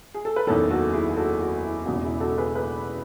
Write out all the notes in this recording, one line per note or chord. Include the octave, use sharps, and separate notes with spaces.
G#4
A4
B4
F#1 E2 D#3 A4 C#5
F#4 A4
E4 G#4
G#4
F#4 A4
F#4
E4
E1 E2 C#3 F#4
E4 G#4
F#4 A4
G#4 B4
G#4 B4